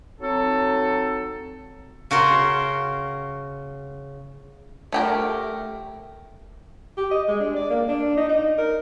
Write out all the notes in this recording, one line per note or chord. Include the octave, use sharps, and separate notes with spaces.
F#3 C4 D#4 A4
C#3 F#4 A#4 C6
A3 G4 A#4
G4
D#5
G#3
D4
D5
A#3
D4
D#4
D#4
A#4